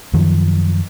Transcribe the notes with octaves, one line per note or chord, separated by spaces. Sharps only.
F#2 D#3 F3